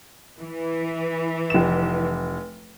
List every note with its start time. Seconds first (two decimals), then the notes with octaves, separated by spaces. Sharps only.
0.39 E3
1.50 F1 E7